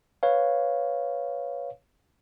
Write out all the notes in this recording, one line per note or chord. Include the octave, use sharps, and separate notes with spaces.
B4 C#5 F5